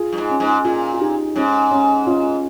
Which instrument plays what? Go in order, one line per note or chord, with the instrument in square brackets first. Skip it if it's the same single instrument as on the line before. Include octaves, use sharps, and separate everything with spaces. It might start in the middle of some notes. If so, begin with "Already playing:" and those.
Already playing: [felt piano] F4 G#4
[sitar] G2
G#2
[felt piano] C#4
[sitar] G#2
[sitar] A#2 [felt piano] F4 G#4
[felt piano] F4
D#4 G4
[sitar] G#2 [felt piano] C#4
[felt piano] C#4
C#4 F4